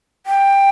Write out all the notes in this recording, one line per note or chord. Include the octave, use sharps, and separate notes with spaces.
G5